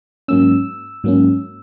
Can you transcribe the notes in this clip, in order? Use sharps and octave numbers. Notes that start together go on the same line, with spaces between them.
G#2 F#3 A#3 C#4 E6
G#2 F#3 A#3 C#4